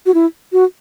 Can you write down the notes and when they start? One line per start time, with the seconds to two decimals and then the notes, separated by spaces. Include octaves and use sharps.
0.06 F#4
0.14 E4
0.53 F#4